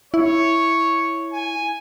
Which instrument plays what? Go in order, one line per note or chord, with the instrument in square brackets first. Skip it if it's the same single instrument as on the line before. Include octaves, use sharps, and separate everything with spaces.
[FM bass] E4 [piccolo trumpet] C#5
[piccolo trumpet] G#5